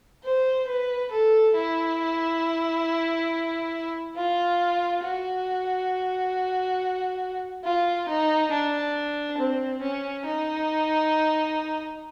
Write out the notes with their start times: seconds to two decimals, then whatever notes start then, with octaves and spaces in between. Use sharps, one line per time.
0.24 C5
0.68 B4
1.11 A4
1.55 E4
4.16 F4
5.03 F#4
7.64 F4
8.08 D#4
8.51 D4
9.38 C4
9.82 C#4
10.25 D#4